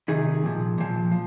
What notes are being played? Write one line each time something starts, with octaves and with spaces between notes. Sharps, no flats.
C3 D#3 G#4
A#2 F3
A#2 F3
F3